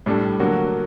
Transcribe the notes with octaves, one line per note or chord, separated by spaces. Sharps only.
A2 G3 D4 A4
D3 F#3 A#3 F#4